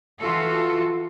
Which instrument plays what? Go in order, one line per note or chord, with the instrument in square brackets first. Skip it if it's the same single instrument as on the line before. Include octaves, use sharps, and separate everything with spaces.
[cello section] E3 F4 F#4 A4